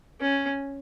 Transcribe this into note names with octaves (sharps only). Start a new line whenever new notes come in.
C#4